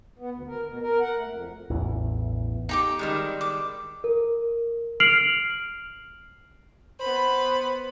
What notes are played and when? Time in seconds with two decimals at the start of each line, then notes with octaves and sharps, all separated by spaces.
0.19 B3
0.34 D2
0.48 A#4
0.67 B2
0.82 A#4
1.00 F#5
1.16 A3
1.29 F2
1.69 A1 E2 E3
2.69 D#4 G4 D6
2.99 D#3 G3 G#3
3.41 D6
4.04 A#4
5.00 F6 C7 D7 F7 F#7
6.99 B3 C5 B5